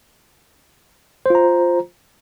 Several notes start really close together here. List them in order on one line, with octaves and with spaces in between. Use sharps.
C5 F4 A#5